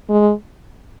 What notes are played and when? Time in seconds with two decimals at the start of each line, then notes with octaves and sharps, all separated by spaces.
0.09 G#3